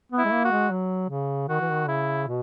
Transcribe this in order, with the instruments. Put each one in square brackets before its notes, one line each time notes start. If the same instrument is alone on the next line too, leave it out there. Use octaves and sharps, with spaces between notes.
[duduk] B3
[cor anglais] E4
[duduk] G#3
A#3
[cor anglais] F#4
[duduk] G#3
F#3
C#3
[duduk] D#3 [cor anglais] F#4
[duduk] E3
D#3
[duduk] C#3 [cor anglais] E4
[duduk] B2